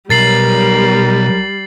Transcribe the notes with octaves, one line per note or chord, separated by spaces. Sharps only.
B1 G3 A#4 A6 C7 F#7